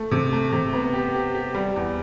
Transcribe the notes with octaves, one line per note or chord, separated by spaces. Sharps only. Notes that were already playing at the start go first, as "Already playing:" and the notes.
Already playing: A3
C3
A3
C3
B3
G4
G4
G4
G3
E2